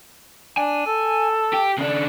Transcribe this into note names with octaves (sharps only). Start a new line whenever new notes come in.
D4 G#5
A4
G4
C#3 D4